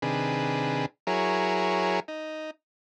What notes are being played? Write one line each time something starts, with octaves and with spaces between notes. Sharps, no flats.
C3 D#3 D4 G#4 B4
F#3 E4 G#4 A#4 C#5
D#4